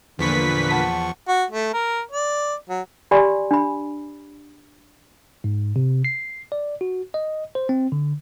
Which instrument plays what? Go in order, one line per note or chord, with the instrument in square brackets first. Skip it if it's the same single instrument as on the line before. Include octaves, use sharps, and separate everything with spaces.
[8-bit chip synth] E2 F3 C#6 [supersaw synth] A#2 B4 B6 [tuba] D3
[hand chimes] F#5 A5
[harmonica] F#4
A3
A#4
D5
F#3
[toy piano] G4 D5 G#5 B5 C6
D4 B5
[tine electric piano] G#2
C3
C7
D5
F#4
D#5
C5
C4
D3